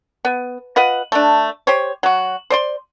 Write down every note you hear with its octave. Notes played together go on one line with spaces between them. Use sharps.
B3
F4 B4 D#5 F#5
A3 D4
G4 C5 C#5
F#3 F#4
C5 D5 C6